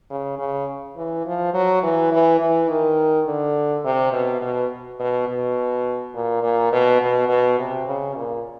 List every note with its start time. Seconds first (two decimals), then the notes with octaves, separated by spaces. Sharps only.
0.10 C#3
0.39 C#3
0.96 E3
1.26 F3
1.54 F#3
1.83 E3
2.12 E3
2.40 E3
2.69 D#3
3.27 D3
3.85 C3
4.13 B2
4.41 B2
5.00 B2
5.28 B2
6.15 A#2
6.43 A#2
6.72 B2
7.01 B2
7.29 B2
7.59 C3
7.87 C#3
8.16 A#2